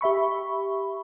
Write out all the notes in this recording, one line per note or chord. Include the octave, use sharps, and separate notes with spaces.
G4 E5 B5 C#6